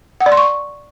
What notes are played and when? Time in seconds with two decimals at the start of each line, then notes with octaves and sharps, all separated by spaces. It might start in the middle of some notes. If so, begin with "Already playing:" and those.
0.21 F#5
0.26 D5
0.32 C6
0.37 C#6